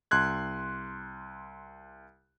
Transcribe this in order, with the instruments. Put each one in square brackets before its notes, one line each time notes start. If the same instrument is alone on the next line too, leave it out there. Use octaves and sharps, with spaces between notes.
[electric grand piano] C2 C6 F#6 G#6